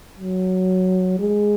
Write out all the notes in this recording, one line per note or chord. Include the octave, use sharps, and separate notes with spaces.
F#3
G#3